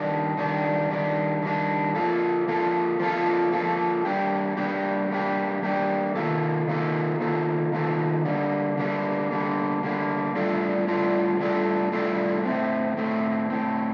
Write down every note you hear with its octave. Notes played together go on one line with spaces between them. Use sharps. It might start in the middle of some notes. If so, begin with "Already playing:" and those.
Already playing: D#3 G3 D4
D#3 G3 D4
D#3 G3 D4
D#3 G3 D4
F3 A#3 F4 A4
F3 A#3 F4 A4
F3 A#3 F4 A4
F3 A#3 F4 A4
G3 A#3 D4 G4
G3 A#3 D4 G4
G3 A#3 D4 G4
G3 A#3 D4 G4
D#3 A#3 F4 A4
D#3 A#3 F4 A4
D#3 A#3 F4 A4
D#3 A#3 F4 A4
D3 G3 A#3
D3 G3 A#3
D3 G3 A#3
D3 G3 A#3
A2 G3 D4 F4 A4
A2 G3 D4 F4 A4
A2 G3 D4 F4 A4
A2 G3 D4 F4 A4
A2 A3 C4
A2 A3 C4
A2 A3 C4